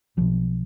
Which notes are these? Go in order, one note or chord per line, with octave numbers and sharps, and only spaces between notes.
B1 B2 F3